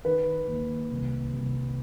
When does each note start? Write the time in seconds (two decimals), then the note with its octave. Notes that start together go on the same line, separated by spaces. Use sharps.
0.05 D#3 B4
0.48 D#2
0.91 C2
1.33 C2